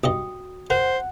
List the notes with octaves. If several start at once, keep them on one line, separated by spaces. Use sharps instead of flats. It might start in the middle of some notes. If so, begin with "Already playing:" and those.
B1 G2 F#4 D#5 G5 D#6
A#4 C5 F#5